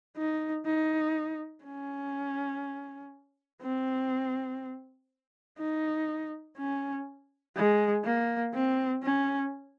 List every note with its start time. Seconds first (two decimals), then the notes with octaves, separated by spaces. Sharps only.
0.17 D#4
0.66 D#4
1.65 C#4
3.62 C4
5.59 D#4
6.57 C#4
7.56 G#3
8.05 A#3
8.54 C4
9.03 C#4